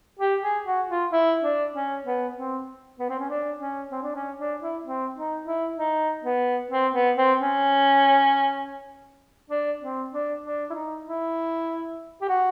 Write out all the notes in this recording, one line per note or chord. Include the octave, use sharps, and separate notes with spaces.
G4
G#4
F#4
F4
E4
D4
C#4
B3
C4
B3
C4
C#4
D4
C#4
C4
D4
C#4
D4
E4
C4
D#4
E4
D#4
B3
C4
B3
C4
C#4
D4
C4
D4
D4
E4
D#4
E4
G4
F#4